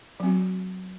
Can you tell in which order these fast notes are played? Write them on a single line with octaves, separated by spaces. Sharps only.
F#3 C4 F#4